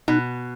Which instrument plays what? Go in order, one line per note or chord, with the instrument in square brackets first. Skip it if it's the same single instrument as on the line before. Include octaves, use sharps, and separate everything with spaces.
[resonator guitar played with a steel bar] B2 [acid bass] D#4